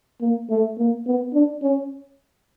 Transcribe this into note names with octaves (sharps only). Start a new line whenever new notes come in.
A#3
A3
A#3
B3
D4
C#4